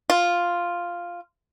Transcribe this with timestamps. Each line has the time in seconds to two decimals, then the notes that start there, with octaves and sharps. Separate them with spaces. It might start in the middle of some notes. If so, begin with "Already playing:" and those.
0.10 F4